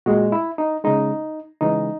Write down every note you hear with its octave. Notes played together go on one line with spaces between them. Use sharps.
A#2 G#3 F#4
E4
D#4
C#3 G#3 D#4
C#3 E3 G#3 D#4